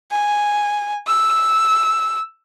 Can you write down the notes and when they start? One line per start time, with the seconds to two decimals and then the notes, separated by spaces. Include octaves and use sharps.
0.11 G#5
1.07 E6